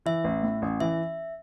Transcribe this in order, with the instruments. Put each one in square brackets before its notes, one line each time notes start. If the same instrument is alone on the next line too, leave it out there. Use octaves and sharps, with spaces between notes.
[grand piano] E3 [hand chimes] E5
[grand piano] A1
A2
A1
[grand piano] E3 [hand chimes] E5